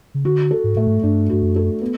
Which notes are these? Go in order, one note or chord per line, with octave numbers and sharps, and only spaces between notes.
C#3
D3 F#4
A4
G#2
A2 A3
G#2
G2 D4
G2 F#4
F#2
A4
B3